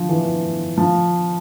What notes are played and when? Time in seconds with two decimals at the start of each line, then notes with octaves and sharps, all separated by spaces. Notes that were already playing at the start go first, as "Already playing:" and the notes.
Already playing: F3
0.09 E3
0.78 F3